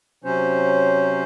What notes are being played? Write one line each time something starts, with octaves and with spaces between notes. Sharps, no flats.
C3 F#3 C#4 C5